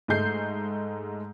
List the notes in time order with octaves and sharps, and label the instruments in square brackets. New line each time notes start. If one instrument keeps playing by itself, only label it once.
[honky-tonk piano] G#2 G#3 A3 G6 C7